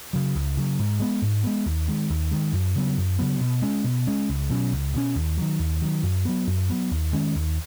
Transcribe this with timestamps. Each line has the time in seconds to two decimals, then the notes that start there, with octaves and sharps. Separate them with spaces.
0.13 C#3 F#3
0.35 C#2
0.57 C#3 F#3
0.79 G#2
1.00 G#3 B3
1.22 G#2
1.44 G#3 B3
1.66 D#2
1.88 D#3 G#3
2.10 D#2
2.31 D#3 G#3
2.53 F#2
2.75 C#3 F#3 B3
2.97 F#2
3.19 C#3 F#3 B3
3.41 B2
3.62 G#3 C#4
3.84 B2
4.07 G#3 C#4
4.29 C#2
4.50 B2 F#3 C#4
4.72 C#2
4.94 B2 F#3 C#4
5.15 D#2
5.37 D#3 F#3
5.59 D#2
5.82 D#3 F#3
6.03 F#2
6.25 F#3 B3
6.47 F#2
6.70 F#3 B3
6.91 D#2
7.13 D#3 G#3 C#4
7.35 D#2